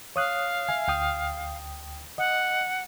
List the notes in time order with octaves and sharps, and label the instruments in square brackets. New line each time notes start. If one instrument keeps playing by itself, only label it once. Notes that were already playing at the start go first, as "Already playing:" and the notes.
[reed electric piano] C#5 D#6 F#6 [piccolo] F5
[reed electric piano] E5 G#5
D2 G5 D#6
[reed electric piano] D#5 [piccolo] F#5